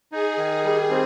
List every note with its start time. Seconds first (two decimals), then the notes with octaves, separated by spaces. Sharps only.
0.11 D#4 G#4
0.37 D#3
0.64 G3
0.90 C4